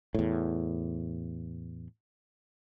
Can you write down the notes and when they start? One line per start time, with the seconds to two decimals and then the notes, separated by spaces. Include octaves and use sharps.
0.15 E2 A2